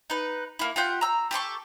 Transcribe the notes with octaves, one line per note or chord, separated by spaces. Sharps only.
D#4 B4
A#3 E4
F4 G4 F#5 G5
A#5 E6
G4 A4 C6 C#6